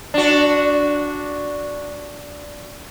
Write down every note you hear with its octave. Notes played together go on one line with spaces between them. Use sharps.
D4 F#4